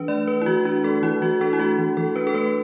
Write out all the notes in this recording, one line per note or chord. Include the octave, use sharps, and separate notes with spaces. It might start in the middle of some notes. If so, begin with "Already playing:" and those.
Already playing: E3 D4 B4
A3 D5
E3 B4
E4
E3 F#4
D4 F#4
A3 A4
E3 E4
E3 F#4
D4 A4
E4
A3 F#4
E3
E3 A4
D4 B4
A4
A3 B4